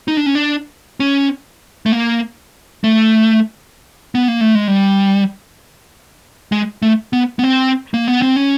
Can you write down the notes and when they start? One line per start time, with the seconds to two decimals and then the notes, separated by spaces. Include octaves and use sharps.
0.08 D#4
0.17 D4
0.26 C#4
0.35 D4
1.00 C#4
1.86 A3
1.92 A#3
2.84 A3
4.15 B3
4.28 A#3
4.41 A3
4.55 G#3
4.68 G3
6.52 G#3
6.82 A3
7.13 B3
7.39 B3
7.44 C4
7.94 A#3
8.08 B3
8.22 C4
8.36 C#4